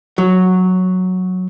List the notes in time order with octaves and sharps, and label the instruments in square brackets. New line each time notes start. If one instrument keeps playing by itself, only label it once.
[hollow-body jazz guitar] F#3